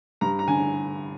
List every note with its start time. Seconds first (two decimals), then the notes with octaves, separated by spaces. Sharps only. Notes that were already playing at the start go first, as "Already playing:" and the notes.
0.21 G2 A#5
0.39 A#5
0.48 D3 G#5